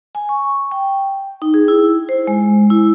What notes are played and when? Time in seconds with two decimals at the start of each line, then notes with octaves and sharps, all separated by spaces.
0.15 G#5
0.29 C#6
0.72 G5
1.42 D#4
1.54 G#4
1.68 E4
2.09 C5
2.27 G#3
2.70 E4